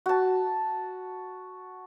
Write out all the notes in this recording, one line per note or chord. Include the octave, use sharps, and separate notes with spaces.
F#4 A5